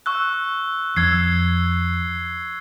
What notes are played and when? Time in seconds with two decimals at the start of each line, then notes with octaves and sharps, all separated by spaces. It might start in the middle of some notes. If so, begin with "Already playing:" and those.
0.06 C#6 E6 F#6
0.96 F2 E6 G#6 C7